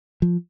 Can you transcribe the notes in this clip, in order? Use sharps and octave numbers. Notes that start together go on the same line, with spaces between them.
F3